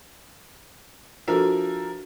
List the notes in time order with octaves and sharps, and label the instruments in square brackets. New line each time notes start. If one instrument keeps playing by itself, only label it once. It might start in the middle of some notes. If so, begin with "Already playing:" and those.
[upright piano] F3 A#4 E5 [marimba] D4 F#4 A4